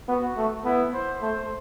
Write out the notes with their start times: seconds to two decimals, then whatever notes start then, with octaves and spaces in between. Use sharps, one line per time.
0.08 B3 F#4
0.37 A3
0.65 B3 E4
0.94 C5
1.21 A3 C5